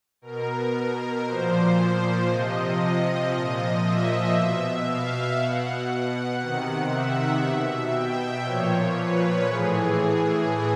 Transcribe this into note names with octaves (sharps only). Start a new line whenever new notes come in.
B2 A#4
A#2 F3 C5
C5
C3 F3 D#5
D#5
A#2 F3 D#5
E5
B2 E5
F5
B2 F#5
C3 D#3
E5
B2
G5
A#2 F3 C#5
B4
A2 E3 G#4
G#4